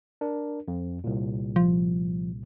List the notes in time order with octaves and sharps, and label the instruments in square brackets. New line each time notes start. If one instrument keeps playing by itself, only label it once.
[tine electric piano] D4 A#4
F2
C2 A#2
[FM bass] F3